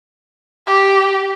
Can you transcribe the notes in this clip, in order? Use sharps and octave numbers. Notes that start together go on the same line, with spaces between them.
G4